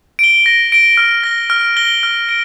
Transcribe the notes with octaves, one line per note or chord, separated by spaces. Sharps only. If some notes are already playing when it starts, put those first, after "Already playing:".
D7 G7
A#6
D7 G7
F6
A#6 G7
F6
A#6 G7
F6
D7